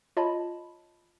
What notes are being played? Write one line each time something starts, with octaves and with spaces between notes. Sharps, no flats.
F4 C#5 D#5 A5 B5